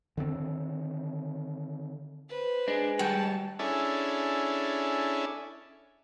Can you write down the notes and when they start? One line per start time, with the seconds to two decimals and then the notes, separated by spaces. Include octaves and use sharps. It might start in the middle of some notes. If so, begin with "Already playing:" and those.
0.17 D3 D#3 A3 C4
2.30 B4 C5
2.68 G#3 D4
2.99 G3 F#4 G5 A5
3.59 C#4 D4 E4 G#4 A4